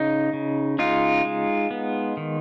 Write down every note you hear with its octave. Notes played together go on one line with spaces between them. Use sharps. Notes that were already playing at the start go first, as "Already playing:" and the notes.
Already playing: C#3 D#4
C#3
G#3 D#4 F4
G#3
B3
D#3